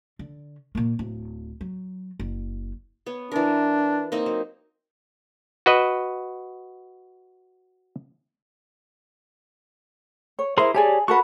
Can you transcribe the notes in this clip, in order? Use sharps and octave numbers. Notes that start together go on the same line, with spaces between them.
D3
A#2 A#3
D1
F#3
F#1
B3 C#5
E3 D4 A#4
A#3 C4 D#4
F#3
F#4 B4 D#5
C#5
E4 G#4 A#4 C5 C6
G4 G#4 C#5 D5 G#5 A5
F#4 A#4 B4 F#5 A5 C#6